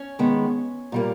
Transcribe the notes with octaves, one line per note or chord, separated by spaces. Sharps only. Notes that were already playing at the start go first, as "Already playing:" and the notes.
Already playing: C#4
D#3 G#3 B3
A#2 G3 A#3